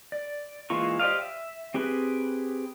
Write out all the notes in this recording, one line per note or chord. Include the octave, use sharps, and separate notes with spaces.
D5
E3 G#3 A#3 F4 C#6
G4 C5 D5 D#5 F5
E5
C4 G4 G#4 B4